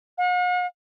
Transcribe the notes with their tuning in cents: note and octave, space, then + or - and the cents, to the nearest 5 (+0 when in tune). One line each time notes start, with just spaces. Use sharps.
F#5 -45